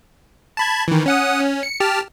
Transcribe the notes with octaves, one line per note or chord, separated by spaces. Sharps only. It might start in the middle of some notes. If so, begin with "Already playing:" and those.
A5 B5 G#6
D#3 E3
C#4 F#5 D#6
C#4
C#7
G4 A5 F6